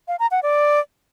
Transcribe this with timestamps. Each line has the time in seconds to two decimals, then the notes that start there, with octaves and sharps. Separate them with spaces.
0.08 F5
0.20 A#5
0.31 F#5
0.43 D5